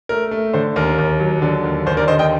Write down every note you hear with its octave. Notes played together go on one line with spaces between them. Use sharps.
A3 A#4
A3
D3 C5
D#2 A#4
D#2
F#3
D3
D#2
D#2 C5
A#4 D5
D3 C5 D#5
D#5 G5